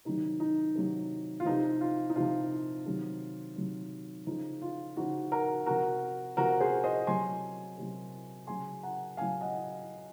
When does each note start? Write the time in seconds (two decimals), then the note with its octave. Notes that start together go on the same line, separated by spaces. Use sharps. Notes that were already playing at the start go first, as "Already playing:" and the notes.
0.05 C3 D#3 F#3 D#4
0.40 D#4
0.75 C3 D#3 F#3
1.40 F4
1.45 C3 F3 D#4
1.81 F4
2.10 D#4
2.16 C3 F3 F4
2.86 C3 D#3 F#3
3.56 C3 D#3 F#3
4.27 C#3 F3 D#4
4.62 F4
4.97 C#3 F3 D#4 F#4
5.32 F#4 A#4
5.66 C3 F3 F#4 A#4
6.37 C3 F3 F#4 A#4
6.60 G#4 C5
6.84 C5 D#5
7.07 C3 F#3 G#5 C6
7.77 C3 F#3
8.47 C#3 F#3 G#5 C6
8.83 F#5 A#5
9.17 C#3 F#3 F5 G#5
9.41 D#5 F#5